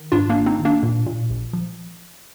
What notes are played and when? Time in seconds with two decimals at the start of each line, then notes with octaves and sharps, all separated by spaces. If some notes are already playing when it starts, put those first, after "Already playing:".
Already playing: D#3
0.12 G#2 D4 F4
0.30 A#3 D4
0.36 G#1
0.46 C4 D#4
0.59 G#1
0.65 A#3 D4
0.83 A#2
1.06 A#2
1.30 A#1
1.53 F3